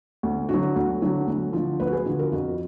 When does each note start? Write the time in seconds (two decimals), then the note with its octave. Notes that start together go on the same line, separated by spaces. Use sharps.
0.23 D2
0.49 D3 F#3 F#4
0.63 F#4
0.76 D2
1.02 D3 F#3
1.27 D2
1.53 D3 F3
1.80 D2 B4
1.87 F#4
1.93 G#4
2.05 D3 F3 F#4
2.19 A#4
2.32 F2 F#4